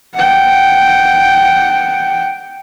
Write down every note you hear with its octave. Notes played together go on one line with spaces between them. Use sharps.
F#5 G5